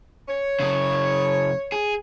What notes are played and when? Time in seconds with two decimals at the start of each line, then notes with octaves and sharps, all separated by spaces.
0.29 C#5
0.60 F#2 C#3
1.72 G#4